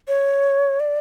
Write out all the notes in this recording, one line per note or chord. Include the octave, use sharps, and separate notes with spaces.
C#5
D5